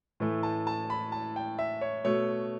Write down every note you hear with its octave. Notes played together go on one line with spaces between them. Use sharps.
A2 E3 A3
A5
A5
B5
A5
G5
E5
C#5
B2 A3 C#5